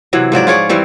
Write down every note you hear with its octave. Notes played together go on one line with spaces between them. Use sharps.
C3 E3 F#3
G#2 F3 F#3 D5
F4 G#4 C#5 D5
E3 G3 C4